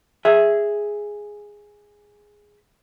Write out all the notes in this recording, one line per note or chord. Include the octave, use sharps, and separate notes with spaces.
G#4 E5